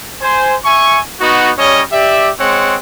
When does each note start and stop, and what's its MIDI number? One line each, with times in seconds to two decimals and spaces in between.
0.22 0.55 72
0.22 0.55 80
0.65 0.99 76
0.65 0.99 80
0.65 0.99 85
1.20 1.51 59
1.20 1.51 63
1.20 1.51 66
1.57 1.83 55
1.57 1.83 61
1.57 1.83 73
1.57 1.83 75
1.92 2.30 67
1.92 2.30 74
1.92 2.30 76
2.39 2.75 56
2.39 2.75 60
2.39 2.75 73
2.39 2.75 78